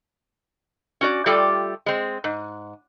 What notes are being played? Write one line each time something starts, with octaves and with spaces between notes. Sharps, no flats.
C#4 F#4 D5
G3 A3 F4 G4 A4 D5
G#3 C4
G#2